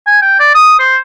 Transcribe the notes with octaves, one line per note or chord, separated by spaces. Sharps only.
G#5
G5
D5
D#6
C5